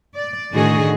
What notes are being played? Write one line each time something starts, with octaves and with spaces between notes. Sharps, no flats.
D5
A2 D3 D#3 F#4 G#4 D#5